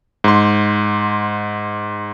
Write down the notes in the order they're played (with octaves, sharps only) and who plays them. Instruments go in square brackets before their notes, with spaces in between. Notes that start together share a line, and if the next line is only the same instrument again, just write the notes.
[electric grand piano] G#2 C6